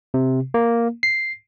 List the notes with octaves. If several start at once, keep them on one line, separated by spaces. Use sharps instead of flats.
C3
A#3
C7